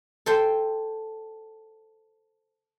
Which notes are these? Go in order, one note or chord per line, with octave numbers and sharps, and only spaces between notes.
A4 C5 G5